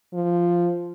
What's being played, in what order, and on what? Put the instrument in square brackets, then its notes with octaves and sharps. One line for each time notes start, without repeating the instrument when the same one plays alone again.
[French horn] F3